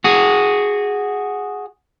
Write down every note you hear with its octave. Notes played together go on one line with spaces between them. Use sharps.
F#4 G#4